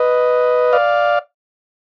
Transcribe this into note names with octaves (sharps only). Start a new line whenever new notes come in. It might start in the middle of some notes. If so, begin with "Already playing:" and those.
Already playing: B4 D#5
D5 F5